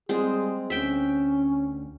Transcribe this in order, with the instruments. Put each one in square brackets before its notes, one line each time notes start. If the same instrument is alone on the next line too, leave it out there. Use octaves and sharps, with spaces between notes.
[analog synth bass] G3 [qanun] G#3 C4 [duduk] G#4
[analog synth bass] D2 [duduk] C#4 [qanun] E5 G5